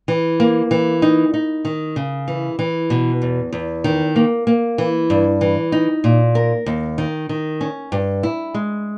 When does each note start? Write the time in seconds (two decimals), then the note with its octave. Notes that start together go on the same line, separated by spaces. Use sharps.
0.08 E3
0.40 A#3
0.71 E3
1.02 D#4
1.34 D#4
1.65 D#3
1.96 C#3
2.28 E3
2.59 E3
2.90 B2
3.22 E2
3.53 E2
3.84 D#3
4.16 A#3
4.47 A#3
4.78 E3
5.10 G2
5.41 E3
5.72 D#4
6.04 A#2
6.35 A#4
6.66 D#2
6.98 D#3
7.29 D#3
7.61 C#4
7.92 G2
8.23 E4
8.54 G#3